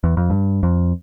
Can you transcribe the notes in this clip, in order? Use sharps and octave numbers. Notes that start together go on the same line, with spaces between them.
E2
F2
G2
F2